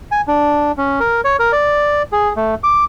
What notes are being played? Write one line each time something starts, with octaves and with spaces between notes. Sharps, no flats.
G#5
D4
C#4
A#4
C#5
A#4
D5
G#4
A3
D6